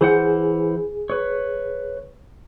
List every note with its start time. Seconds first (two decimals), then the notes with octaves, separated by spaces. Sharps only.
0.01 E3 G#4 C5 F#5
1.10 B4 C#5